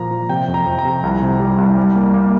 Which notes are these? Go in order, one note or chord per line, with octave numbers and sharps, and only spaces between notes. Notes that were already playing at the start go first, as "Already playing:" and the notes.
Already playing: A#2 F3 A#3 A#5
F3
C3 G5
F2
A#5
F2
A#5
C3
C2
C3
G3
C2
G3
A#3
A#3